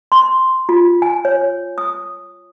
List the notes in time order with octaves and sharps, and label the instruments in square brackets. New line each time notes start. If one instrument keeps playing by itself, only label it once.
[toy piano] C6
F4
G#5
C#5
D#6